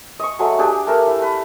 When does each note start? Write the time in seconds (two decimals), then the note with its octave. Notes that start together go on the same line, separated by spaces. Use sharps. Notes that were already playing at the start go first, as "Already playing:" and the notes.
0.20 D#5 C#6
0.39 F#3 G#3 A3
0.59 D4 G4 G#4 B4
0.87 A3 A#4
1.07 E4
1.22 B4